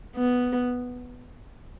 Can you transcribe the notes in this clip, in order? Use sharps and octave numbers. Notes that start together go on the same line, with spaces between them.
B3